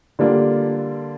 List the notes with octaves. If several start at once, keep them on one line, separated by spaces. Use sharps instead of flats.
D3 G3 A#3 D4 F4